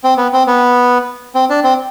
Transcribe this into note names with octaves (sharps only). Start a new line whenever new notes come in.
C4
B3
C4
B3
C4
D4
C4